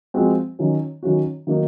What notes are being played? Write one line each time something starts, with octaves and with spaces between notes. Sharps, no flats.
F3 G#3 C4 F#4
D#3 F#3 C#4
D#3 F#3 C#4 F#4
D#3 F#3 A#3 D#4 F#4